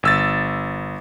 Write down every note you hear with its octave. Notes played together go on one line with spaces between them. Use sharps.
G1 E6 A6